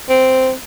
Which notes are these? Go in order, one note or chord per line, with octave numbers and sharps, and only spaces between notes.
C4